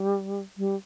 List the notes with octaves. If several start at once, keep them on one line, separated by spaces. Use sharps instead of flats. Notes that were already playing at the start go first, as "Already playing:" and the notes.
Already playing: G3
G3